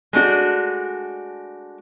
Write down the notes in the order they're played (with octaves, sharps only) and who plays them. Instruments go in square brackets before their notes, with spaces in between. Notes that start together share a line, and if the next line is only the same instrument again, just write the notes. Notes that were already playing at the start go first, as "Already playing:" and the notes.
[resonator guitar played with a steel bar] G#3 A3 D4 F#4